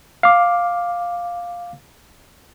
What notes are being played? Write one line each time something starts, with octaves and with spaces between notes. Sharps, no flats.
F5 D6